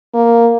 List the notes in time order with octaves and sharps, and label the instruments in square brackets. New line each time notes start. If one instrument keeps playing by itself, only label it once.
[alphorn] A#3